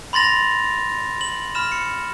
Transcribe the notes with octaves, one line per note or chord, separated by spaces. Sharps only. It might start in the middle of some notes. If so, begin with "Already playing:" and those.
B5 C6 A6 A#6 F7
F#7
B5 F6 E7
C#7